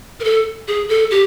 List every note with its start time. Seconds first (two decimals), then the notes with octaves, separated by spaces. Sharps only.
0.20 A#4
0.24 A4
0.68 G#4
0.89 A4
1.11 G4